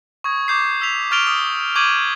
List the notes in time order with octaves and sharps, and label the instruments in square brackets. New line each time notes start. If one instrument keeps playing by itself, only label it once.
[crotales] C#6 D#6 G#6
D6 G6 C7
E6 B6 F7
C#6 F6 A6 D7 F7 G7
D#6
C#6 D6 G6 G#6 D#7 F#7